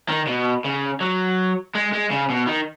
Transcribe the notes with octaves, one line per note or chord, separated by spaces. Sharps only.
D#3
B2
C#3
F#3
G#3
G#3
C#3
B2
D#3